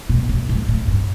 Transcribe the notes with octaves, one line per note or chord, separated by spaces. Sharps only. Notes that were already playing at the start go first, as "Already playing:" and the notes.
B2
B2
A2
A2
G2